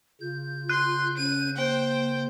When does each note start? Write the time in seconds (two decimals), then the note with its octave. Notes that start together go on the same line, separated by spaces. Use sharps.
0.21 C#3 F4 G6
0.69 C6 F#6
1.17 C#4 D#7
1.56 A#3 C5 G5